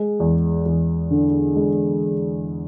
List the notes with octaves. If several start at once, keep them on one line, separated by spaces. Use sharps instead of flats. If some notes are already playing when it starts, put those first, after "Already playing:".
Already playing: G#3
E2
E2
D3
G#3